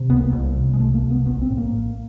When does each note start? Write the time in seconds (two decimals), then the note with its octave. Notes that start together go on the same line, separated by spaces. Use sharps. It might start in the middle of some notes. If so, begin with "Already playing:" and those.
Already playing: C3
0.09 C2 B3
0.17 A#3
0.33 C2
0.56 C3
0.73 G#3
0.79 C3 A3
0.95 A#3
1.03 C2
1.11 B3
1.26 A#1 B3
1.42 C4
1.50 A2
1.58 A#3